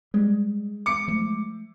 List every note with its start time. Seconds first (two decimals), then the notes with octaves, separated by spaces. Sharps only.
0.14 G3 G#3
0.86 D6 C#7
1.08 F3 A3